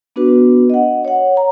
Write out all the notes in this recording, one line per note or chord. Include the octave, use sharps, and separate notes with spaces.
B3 D4 F#4 B4
D#5 F#5
C#5 F#5
A#5